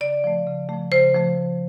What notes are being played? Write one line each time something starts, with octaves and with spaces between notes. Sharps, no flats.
C#3 D5
F3 A3
C#3
F3 A3
C#3 C5
F3 A3